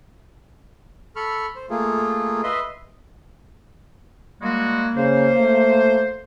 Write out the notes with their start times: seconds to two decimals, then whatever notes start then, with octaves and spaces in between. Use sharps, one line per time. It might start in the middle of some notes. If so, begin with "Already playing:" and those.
1.16 A4 B5 C#6 F6
1.55 C5
1.70 A3 A#3 F4 G#4
2.43 B4 D#5 E5 C6
4.42 G3 G#3 A#3 F#4
4.97 C#3 C5
5.38 A3